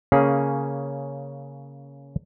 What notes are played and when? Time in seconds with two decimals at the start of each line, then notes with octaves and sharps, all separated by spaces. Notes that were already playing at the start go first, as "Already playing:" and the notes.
0.12 C#3 A#3 C#4 G#4